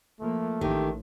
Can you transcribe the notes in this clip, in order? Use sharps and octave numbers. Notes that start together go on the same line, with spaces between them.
F3 A3 A#3
A1 D#3 G4